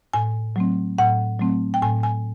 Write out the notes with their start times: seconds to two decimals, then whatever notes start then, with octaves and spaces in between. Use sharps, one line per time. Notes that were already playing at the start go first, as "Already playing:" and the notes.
0.13 A2 G#5
0.56 F#3 A3 C4
0.98 A2 F#5
1.40 F#3 A3 C4
1.74 G5
1.82 A2 G#5
2.03 G#5